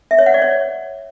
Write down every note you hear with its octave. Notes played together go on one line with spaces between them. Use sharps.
E5
C#5
F#5
D5
C#5